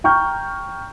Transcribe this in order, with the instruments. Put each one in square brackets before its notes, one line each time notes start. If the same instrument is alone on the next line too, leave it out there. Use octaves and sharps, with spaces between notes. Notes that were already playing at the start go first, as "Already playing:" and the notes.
[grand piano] G5 A#5 C#6 F6 G6